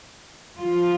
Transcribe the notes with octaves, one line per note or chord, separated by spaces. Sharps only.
F3 F4